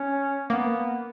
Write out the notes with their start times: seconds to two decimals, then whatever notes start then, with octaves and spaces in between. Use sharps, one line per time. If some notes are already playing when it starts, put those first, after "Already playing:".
Already playing: C#4
0.49 A#3 B3